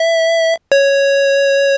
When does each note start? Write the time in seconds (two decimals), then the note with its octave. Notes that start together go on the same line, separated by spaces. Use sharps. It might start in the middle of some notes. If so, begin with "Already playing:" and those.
Already playing: E5
0.72 C#5